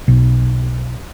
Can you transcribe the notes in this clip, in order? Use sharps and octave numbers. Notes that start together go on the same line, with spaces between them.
B1